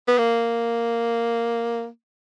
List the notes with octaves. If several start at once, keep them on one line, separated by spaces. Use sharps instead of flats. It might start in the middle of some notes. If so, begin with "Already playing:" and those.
B3
A#3